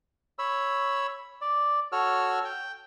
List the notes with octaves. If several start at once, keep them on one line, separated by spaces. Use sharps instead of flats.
C#5 B5 E6
D5
F#4 A4 C#5 E6 F6
G5